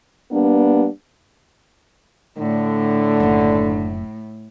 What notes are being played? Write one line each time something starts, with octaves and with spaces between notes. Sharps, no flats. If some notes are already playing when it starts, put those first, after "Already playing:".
G3 A#3 B3 D4
A2 D3
F#1 F#2